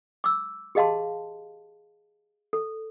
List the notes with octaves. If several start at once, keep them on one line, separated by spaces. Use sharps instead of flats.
D6 E6
G4 G#4 D#5 F5 A5 C6
A4